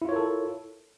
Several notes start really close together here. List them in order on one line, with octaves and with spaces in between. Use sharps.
E4 F4 C#5 A#4 A4